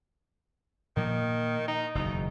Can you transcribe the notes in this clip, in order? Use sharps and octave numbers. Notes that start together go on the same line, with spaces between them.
A#2 D#3 F3 A#3
D#4
F#1 E2 B2 D#4